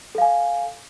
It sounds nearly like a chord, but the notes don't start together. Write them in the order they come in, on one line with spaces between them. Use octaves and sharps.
A4 F5 G#5